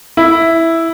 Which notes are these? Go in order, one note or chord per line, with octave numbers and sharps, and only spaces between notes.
E4